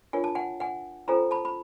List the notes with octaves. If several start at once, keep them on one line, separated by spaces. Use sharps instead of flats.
D4 F4 A#4 C#5 G#5
A5
F#5 G#5
F#5 G#5
C#4 F4 A4 C5 G#5 A#5
A5 B5
B5